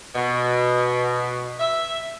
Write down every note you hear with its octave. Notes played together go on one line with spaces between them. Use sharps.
B2
E5